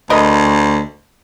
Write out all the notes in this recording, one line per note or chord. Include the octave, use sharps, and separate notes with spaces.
D2 A#4 B4 D#5